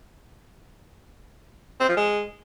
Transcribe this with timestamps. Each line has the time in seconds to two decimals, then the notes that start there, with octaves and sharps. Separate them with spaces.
1.80 C4
1.89 F3
1.97 G#3